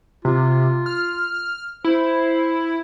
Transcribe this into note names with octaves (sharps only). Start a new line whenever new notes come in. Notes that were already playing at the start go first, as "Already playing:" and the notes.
C3 F4
F6
E4 C5